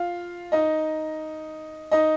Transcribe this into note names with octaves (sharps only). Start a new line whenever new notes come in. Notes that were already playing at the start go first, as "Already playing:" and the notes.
Already playing: F4 F5
D#4 D#5
D#4 D#5